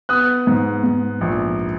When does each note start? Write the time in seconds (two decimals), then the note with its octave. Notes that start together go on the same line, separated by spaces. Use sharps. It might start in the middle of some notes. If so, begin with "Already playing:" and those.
0.09 B3 D#6 F#6
0.47 G#2
0.84 G#2
1.21 A#1